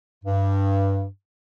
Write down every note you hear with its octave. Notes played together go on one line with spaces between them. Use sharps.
G2